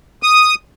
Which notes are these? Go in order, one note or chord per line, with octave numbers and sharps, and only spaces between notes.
D#6